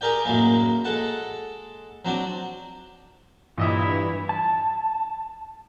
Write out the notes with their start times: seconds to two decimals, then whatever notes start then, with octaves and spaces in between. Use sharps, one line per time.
0.01 G4 G#4 A#4 D5 G5
0.25 F#2 A2 F#3 G#3 A#3
0.84 G#3 A4 F#5 A5
2.05 F#3 C4 D4 F#4
3.58 G2 A#2 E3 E4 C#5 D#5 E5
4.29 A5